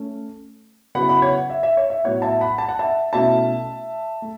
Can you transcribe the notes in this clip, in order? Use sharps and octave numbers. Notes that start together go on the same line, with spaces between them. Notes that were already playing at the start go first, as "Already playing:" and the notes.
Already playing: A3 C#4
C#3 F#3 B3 E4 F#5 B5
F#5 B5
C#5 F#5
E5
E5
C#5
E5
A2 F#3 B3 E4 C#5 F#5
E5 A5
F#5 B5
A5
F#5
E5 A5
B2 A3 C#4 E4 E5 A5
A3